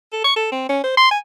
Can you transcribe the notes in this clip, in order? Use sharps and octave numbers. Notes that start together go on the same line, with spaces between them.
A4
C#6
A4
C4
C#4
C5
C6
G#5